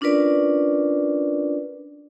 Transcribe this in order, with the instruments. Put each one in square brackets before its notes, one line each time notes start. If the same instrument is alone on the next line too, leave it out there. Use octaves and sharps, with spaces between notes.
[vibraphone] C#4 D4 F4 A#4 B4 D5